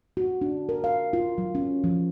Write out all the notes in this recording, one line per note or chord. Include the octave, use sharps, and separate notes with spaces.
F#4
D4
A#4
F5
F4
F#3
C#4
F3